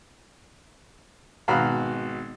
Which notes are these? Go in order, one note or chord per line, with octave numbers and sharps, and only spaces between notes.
G#1 B2 F#4 F5 A#5 B5